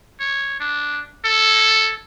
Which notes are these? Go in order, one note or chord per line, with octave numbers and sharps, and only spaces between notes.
C#5
D4
A4